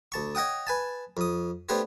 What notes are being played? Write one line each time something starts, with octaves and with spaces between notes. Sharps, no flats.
D2 A5 C#6
C#5 D#5 F#5 G5 D#6
B4 G#5 A5
F2 D#6
A3 B3 D4 G4 C5 C#5